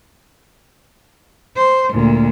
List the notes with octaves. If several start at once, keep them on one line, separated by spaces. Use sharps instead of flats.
C5
D2 A#2